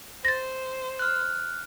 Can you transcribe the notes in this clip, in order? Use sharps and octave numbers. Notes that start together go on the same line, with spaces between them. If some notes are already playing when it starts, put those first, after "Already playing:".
C5 A6 A#6
F6 F#6